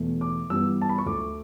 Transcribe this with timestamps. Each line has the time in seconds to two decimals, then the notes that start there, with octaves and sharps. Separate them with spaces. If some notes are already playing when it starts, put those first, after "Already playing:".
Already playing: E2 B2 A3
0.21 D6
0.50 G2 E3 G3 B3 E6
0.82 A5
0.89 B5
0.98 C#6
1.06 D2 D3 A3 D6